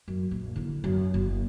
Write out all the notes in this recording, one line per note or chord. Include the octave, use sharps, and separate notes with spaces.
F#2
A#1
D3 E4
F#2
F#1